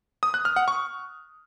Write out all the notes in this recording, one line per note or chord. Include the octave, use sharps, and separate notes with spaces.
D#6
F#6
F6
F#5
C#6